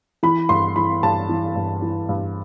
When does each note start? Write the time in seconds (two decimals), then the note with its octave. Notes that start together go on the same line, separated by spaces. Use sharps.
0.23 E3 B5
0.49 G2 C6
0.76 E3 B5
1.03 G2 A5
1.29 E3
1.56 G2
1.82 E3
2.09 G2